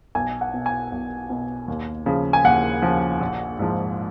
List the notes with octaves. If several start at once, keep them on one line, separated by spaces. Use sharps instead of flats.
B1 G#5
F#5
B2
G#5
B1
B2
D#2
C#3 F3
G#5
D#2 F#5
C#3 F3
A#1
G#2 F3